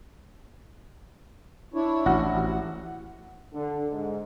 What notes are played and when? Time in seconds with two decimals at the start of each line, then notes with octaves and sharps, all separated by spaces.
1.74 D4 E4 C#5
2.06 A1 F#4
2.29 F3 E4 G4
2.44 F#5
3.54 D3
3.91 G#2